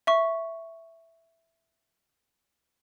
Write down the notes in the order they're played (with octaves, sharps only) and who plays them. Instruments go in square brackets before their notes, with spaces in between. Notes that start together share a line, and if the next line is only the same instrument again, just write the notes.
[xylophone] E5 C#6